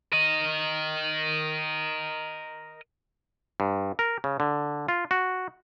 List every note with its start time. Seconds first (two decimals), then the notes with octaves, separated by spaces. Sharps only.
0.12 A#4 D#5
3.60 G2
3.99 A#4
4.24 C#3
4.40 D3
4.88 F4
5.11 F#4